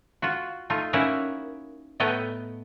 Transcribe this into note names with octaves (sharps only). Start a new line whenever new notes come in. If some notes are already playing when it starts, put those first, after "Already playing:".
F4 F#4
A3 D#4 F4
A#3 C#4 D#4 E4 F#4 A#4
A2 A3 B3 D#5 G5 A#5